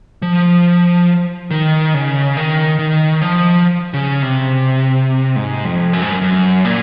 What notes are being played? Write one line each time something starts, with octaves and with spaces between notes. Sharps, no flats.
F3
D#3
C#3
D#3
D#3
F3
C#3
C3
G#2
F2
F#2
G#2
F#2
F#2
A#2